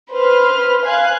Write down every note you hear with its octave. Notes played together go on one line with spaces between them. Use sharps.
B4 C5 F6
F5 G#5 F#6